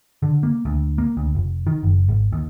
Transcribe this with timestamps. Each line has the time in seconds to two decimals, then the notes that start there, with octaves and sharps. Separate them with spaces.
0.22 D3
0.43 A#3
0.65 D2
0.98 A#3
1.17 D2
1.35 F1
1.67 D#3
1.83 F#1
2.09 G#1
2.33 D#2